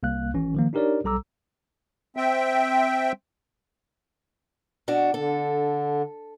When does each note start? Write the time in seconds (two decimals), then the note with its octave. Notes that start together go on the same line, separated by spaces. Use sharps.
0.03 C2 A#3 F5 F#6
0.34 G#1 E3 C#4
0.55 D#3 F3 A#3
0.73 D4 D#4 G4 A#4 C#5 D5
1.04 B1 G3 A4 A#5 D6 E6
2.17 C4 E5 G5
4.88 B2 D4 F#4
5.14 D3 A4